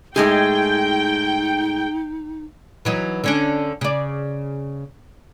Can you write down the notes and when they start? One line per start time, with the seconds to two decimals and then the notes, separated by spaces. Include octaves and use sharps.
0.16 A2 G#3 D#4 G#4 G5
2.85 E3 F#3 D#4
3.24 D3 C#4 D4
3.81 C#3 D5